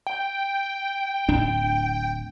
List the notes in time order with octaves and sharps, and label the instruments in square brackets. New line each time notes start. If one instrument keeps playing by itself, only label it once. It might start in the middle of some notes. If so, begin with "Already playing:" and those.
[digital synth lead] G5
[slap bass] D1 D4